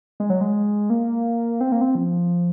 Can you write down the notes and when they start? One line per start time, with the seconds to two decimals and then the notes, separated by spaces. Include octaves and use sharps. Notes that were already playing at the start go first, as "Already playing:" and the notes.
0.20 G#3
0.30 F#3
0.41 G#3
0.90 A#3
1.61 C4
1.72 A#3
1.81 C4
1.95 F3